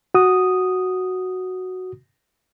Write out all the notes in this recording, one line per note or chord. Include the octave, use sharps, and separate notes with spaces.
F#4 D#6